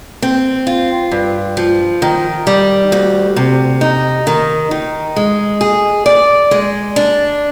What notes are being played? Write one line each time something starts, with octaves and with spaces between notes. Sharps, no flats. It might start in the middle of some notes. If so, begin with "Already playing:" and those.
C4
F4
G2
F3
D#3
G3
D2
C3
D#4
D#3
D#3
G#3
G#4
D5
G#3
D4